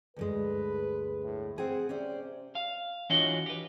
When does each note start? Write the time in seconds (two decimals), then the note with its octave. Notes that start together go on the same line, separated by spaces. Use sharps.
0.16 D2 G2 G#3 B4
1.24 A2
1.58 C4 G#4 F#5
1.89 C3 C#4 C5 D5
2.55 F5
3.10 E3 D4 F4 F#4 C#5 D#5
3.46 G4 B4